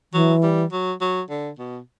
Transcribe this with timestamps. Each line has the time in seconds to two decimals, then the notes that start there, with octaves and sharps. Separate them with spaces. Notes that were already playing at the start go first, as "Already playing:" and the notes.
0.13 E3 F#3
0.43 G3
0.72 F#3
1.01 F#3
1.30 D3
1.59 B2